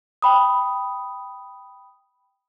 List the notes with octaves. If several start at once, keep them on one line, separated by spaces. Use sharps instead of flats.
G5 B5 D#6